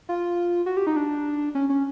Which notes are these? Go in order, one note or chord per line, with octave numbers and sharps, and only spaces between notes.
F4
F#4
G4
D#4
D4
C#4
C#4